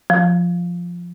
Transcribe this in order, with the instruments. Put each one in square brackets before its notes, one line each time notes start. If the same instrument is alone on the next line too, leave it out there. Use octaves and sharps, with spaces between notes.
[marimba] F3